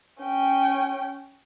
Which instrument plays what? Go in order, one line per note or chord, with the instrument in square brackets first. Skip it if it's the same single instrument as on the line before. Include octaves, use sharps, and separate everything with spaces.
[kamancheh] C#4 G5